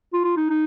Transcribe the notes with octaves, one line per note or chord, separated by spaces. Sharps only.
F4
F4
D#4
D#4